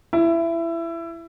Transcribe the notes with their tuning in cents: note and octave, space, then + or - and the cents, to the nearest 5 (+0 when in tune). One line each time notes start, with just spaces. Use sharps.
E4 +20